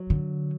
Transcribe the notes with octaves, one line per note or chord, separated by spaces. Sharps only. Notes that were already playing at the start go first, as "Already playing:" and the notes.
Already playing: F#3
D3